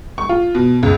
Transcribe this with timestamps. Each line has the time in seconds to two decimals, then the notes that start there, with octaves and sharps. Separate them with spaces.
0.18 C#6
0.29 F4
0.55 B2
0.83 C#2